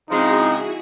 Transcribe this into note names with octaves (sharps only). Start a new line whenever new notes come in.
C#3 F3 G#3 C4 D#4 E4 F#4 G#4